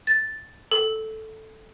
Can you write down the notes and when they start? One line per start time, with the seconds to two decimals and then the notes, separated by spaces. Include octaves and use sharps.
0.07 A6
0.72 A4